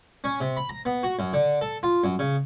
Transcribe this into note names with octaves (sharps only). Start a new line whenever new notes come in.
C#4
C3
B5
A#5
B3
F#4
F#2
D3
A4
F4
F#2
C#3